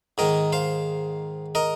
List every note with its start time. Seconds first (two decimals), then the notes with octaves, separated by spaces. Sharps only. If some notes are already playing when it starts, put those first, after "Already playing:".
0.18 G#2 D#3 A#4 D#5
0.53 C5 F5
1.55 A#4 D#5